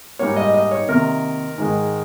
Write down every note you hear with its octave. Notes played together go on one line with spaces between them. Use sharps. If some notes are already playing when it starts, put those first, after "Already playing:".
G#2 G3 A#3 C#5
D#5
D#5
C#5
C3 D#3 A#3 A#4
G#2 D#3 G#3